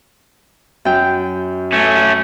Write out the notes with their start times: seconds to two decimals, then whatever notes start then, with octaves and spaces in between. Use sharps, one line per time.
0.85 F#2 G5
1.72 A3 C#4